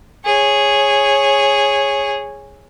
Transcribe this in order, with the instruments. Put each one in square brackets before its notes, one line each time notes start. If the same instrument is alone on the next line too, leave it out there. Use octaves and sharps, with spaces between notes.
[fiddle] G#4 C#5